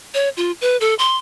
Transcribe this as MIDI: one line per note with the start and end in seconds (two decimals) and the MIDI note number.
0.14 0.29 73
0.37 0.52 65
0.61 0.77 71
0.81 0.94 69
0.99 1.16 84